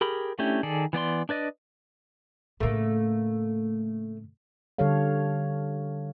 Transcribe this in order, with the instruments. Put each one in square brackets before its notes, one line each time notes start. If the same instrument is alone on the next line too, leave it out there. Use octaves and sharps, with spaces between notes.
[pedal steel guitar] G4 G#4 A#4 B5
A3 C#4 D4 E4 G4
D#3 G#4 A4 D5
E3 B3 D5 C6
D4 B4 D5 D#5
[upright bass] A2 C#3 [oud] A3 A#3
[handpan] D3 G3 G4 A4 C#5 F5